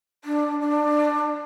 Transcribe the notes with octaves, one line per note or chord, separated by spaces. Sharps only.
D4
D4